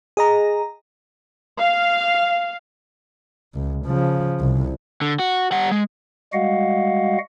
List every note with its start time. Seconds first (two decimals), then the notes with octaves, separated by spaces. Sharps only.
0.17 G#4 D#5 A#5
1.58 F5
3.54 C#2
3.86 C#3 F3
4.40 C2
5.01 D3
5.19 F#4
5.52 G3 F#5
5.72 G#3
6.33 G3 G#3 F#4 D#5 F5 F#5